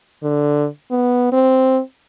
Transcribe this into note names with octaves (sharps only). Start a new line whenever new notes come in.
D3
B3
C4